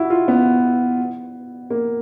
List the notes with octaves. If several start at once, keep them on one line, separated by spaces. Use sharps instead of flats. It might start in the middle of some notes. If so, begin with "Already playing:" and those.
Already playing: E4 F#4
F4
B3
A#3